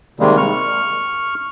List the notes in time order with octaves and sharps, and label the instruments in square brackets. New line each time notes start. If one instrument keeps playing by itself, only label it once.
[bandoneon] C3 D#3 G3 G#3 A#3
C#6 F6